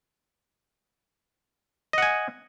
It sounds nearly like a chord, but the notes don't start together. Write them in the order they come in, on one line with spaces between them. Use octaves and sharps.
D#5 F#5 G#5